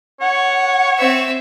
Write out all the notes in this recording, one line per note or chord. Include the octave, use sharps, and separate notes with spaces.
C#5 F#5
C4 E5